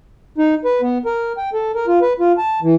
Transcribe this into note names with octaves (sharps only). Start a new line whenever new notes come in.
D#4
B4
B3
A#4
G5
A4
A#4
F4
B4
F4
A5
E3